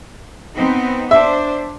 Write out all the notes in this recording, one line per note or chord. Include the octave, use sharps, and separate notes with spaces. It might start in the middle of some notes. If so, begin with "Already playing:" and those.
B3 C4 D#4
D4 C5 E5